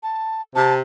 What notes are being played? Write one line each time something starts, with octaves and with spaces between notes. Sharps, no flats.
A5
C3 A5